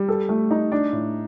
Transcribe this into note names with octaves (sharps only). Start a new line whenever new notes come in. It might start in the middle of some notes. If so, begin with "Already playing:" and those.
Already playing: G3
A4
A3
D#4
D4
A2